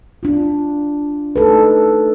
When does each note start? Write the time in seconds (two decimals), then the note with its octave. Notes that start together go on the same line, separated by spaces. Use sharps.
0.23 D4 F4
1.36 A3 D#4 A4 B4